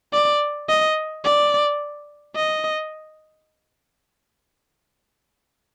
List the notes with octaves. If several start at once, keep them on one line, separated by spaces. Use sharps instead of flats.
D5
D#5
D5
D#5